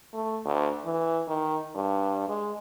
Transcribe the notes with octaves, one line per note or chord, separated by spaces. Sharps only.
A3
D2
E3
D#3
G2
G#3